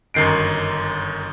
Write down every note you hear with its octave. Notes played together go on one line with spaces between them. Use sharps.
G1 F#2 D#3 C7 D7